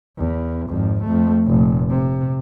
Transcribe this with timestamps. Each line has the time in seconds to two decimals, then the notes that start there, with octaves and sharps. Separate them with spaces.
0.18 E2
0.69 G#1 F2
1.04 F2 A3
1.47 F1 A#2
1.90 C3